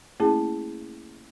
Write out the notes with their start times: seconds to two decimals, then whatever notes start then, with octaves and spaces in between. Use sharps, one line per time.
0.20 A3 A#3 C#4 E4 G#4 A5